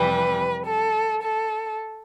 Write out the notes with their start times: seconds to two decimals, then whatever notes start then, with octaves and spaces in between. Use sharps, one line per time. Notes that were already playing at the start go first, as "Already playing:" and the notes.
Already playing: F2 C3 E3 G3 B4
0.66 A4
1.22 A4